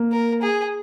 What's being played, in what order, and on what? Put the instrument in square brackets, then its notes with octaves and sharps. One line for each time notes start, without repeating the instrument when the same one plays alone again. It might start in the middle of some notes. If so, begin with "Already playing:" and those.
Already playing: [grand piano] A#3
[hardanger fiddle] A#4
G#4